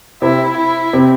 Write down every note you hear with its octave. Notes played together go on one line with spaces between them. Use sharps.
C3 C4 E4
E4
C3 C4